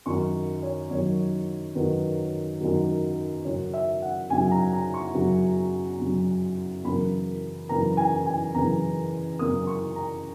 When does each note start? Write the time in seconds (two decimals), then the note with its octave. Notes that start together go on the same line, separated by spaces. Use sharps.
0.06 F#2 D#3 F#3 C#6
0.62 C#5
0.90 F#2 D#3 F#3 C#5
1.75 F#2 D#3 F#3 B4
2.60 F#2 D#3 F#3
3.44 F#2 C#3 F#3 C#5
3.73 E5
4.02 F#5
4.30 F#2 C#3 F#3 G#5
4.51 A#5
4.73 A#5
4.94 C#6
5.15 F#2 C#3 F#3
6.00 F#2 C#3 F#3
6.84 F#2 C#3 E3 A#3 B5
7.69 F#2 C#3 E3 A#3 A#5
7.97 G#5
8.26 G#5
8.54 F#2 C#3 E3 A#3 A#5
9.39 F#2 C#3 E3 A#3 D#6
9.67 C#6
9.96 A#5